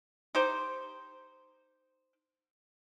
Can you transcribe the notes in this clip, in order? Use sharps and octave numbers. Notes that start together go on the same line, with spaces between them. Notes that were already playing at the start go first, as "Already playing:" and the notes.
D#4 G4 C5